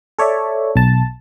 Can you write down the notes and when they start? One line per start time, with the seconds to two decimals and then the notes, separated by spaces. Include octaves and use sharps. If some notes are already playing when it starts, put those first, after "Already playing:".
0.19 A4 C#5 D5 E5
0.76 B1 A5